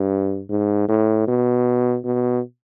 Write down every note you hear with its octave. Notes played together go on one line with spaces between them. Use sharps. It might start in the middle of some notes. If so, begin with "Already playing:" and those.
Already playing: G2
G#2
A2
B2
B2